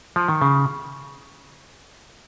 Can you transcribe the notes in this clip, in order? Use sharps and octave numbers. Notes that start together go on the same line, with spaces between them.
F3
D#3
C#3